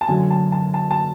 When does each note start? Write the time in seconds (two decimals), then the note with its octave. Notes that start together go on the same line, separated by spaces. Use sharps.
0.01 A5
0.08 F#2 D3 F#3 A3 G#5
0.31 A5
0.52 A5
0.74 A5
0.91 A5